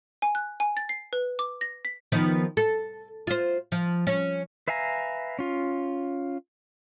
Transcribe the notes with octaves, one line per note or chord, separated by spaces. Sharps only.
G#5
F#6
G#5
A6
C7
B4
D6
A#6
B6
D#3 F3 B3
A4
F4 C5
F3
C#4
B4 E5 F5 G#5 A#5
C#4 F4